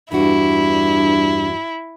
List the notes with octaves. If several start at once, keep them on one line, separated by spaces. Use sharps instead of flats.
E2 G2 D4 E4 F#4